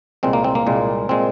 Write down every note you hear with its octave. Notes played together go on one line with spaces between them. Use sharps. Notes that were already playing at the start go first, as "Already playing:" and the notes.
C2 A#2 G#3 C4
A#3
C4
A#3
C2 A#2 G#3
A#2 G#3 C4